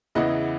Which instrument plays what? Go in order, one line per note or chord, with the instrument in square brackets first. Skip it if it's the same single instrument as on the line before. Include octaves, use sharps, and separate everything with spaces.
[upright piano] E2 C#3 E3 B3 E4 D#5 F#5